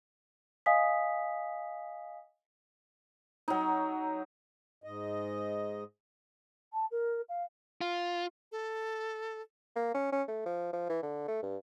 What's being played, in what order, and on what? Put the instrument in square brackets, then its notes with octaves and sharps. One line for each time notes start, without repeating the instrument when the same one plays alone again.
[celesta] D#5 F5 G#5 D#6 B6
[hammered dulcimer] F#3 D#4
[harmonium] G#2 D#5
[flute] A5
A#4
F5
[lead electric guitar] F4
[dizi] A4
[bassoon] A#3
C#4
C#4
A3
F3
F3
E3
D3
A3
G2